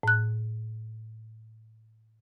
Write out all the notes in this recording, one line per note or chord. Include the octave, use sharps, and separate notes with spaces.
A2 F#6